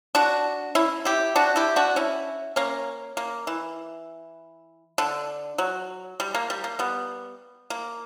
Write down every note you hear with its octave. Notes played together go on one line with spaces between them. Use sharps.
D4 F#4
C#4 E4
E4 G4
D4 F#4
E4 G4
D4 F#4
C#4 E4
A#3 C#4
A#3
E3
D3
F#3
G3
A#3
G3
A#3
G3 B3
A#3